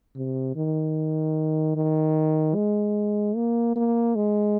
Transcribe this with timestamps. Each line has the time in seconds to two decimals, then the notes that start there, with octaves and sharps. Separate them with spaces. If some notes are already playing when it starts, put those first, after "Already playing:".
0.16 C3
0.56 D#3
1.76 D#3
2.55 G#3
3.36 A#3
3.76 A#3
4.16 G#3